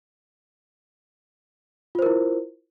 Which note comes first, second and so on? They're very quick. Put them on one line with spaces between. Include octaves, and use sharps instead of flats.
F4 C5 A#4 E4